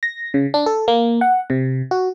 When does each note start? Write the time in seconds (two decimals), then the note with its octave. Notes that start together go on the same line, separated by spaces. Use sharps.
0.03 A#6
0.34 C#3
0.54 D4
0.66 A4
0.88 A#3
1.21 F#5
1.50 C3
1.91 F#4